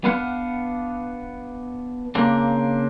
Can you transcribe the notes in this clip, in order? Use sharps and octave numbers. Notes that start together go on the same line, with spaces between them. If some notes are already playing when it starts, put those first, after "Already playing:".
B3 D4 B4 F5 F#5
C#3 A#3 C4 D4